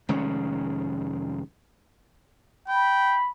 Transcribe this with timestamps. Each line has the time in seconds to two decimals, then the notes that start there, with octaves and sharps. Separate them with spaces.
0.09 F1 D#3 G#3 C#4
2.68 G5 B5